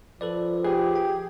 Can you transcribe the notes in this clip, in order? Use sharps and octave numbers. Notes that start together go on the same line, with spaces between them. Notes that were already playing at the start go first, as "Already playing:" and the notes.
F3 A4 B4 D5
G4 G#4 B4
G5